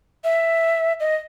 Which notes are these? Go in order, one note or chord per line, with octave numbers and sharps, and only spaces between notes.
E5
D#5